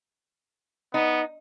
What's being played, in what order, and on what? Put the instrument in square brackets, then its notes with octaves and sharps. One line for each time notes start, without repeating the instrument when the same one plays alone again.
[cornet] B3 [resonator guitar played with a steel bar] D#4